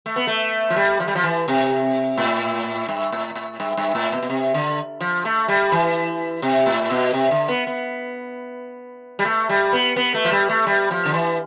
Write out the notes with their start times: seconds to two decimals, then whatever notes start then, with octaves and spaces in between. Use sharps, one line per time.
0.06 A3
0.16 B3
0.27 A3
0.70 F3
0.76 G3
1.00 F3
1.08 G3
1.15 F3
1.23 E3
1.48 C3
2.17 A2
2.89 G2
3.12 A2
3.36 A2
3.60 G2
3.77 G2
3.95 A2
4.12 B2
4.23 B2
4.30 C3
4.54 D3
5.01 F3
5.25 A3
5.48 G3
5.72 E3
6.42 C3
6.66 A2
6.90 B2
7.13 C3
7.31 D3
7.48 B3
7.67 B3
9.19 G3
9.25 A3
9.49 G3
9.73 B3
9.96 B3
10.14 A3
10.25 F3
10.32 G3
10.49 A3
10.67 G3
10.91 F3
11.05 D3
11.14 E3